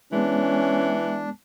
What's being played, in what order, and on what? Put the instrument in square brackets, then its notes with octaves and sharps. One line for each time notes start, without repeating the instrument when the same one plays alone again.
[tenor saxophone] E3 [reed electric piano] G#3 B3 [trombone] C#4 [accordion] D4